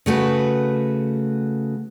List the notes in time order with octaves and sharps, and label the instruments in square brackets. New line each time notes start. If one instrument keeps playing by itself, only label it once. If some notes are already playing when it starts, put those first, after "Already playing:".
[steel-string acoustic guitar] C#3 A3 F#4 B4